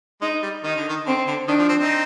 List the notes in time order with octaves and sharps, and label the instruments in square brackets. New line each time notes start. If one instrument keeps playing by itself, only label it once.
[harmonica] G#3 [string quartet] D#4
[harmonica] G3
[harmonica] D#3 [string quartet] D#4
[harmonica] D3
D#3
[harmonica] D3 [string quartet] C4
[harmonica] D3
[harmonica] D#3 [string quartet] D4
[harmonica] F3
C4
C4 D#4